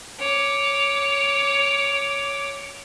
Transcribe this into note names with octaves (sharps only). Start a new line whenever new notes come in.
C#5 D6